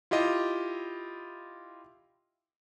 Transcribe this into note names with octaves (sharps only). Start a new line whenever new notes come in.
E4 F4 G4 D#5